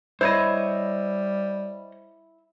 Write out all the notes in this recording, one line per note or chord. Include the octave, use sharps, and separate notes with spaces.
G3 E4 C5 C#5 D#5